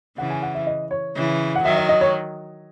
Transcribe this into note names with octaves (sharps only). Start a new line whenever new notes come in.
C#3 E3 F#5
G#5
F#5
E5
D#5
C#5
C#3 E3
F#5
D#3 F#3 E5
D#5
D#5
C#5